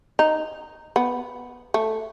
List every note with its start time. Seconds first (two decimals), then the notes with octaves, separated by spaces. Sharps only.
0.19 D#4
0.96 B3
1.74 A3